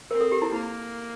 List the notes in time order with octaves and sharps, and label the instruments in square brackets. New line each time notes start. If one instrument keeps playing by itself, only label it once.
[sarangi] C4 [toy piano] A#4
[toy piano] A4
G4
E4
[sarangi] A#3 [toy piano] E4